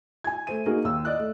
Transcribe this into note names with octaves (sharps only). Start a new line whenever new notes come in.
G#5 G#6
A3 C5 D#7
A#3 D#4 F#4 G#4 A#4
D#2 E6
D5 D#5 F#6
A3